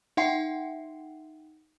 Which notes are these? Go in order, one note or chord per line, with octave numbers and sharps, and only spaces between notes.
D#4 E5 F#5 G5 C6 C7